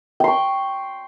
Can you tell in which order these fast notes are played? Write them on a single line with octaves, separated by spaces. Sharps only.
G5 C6 C#6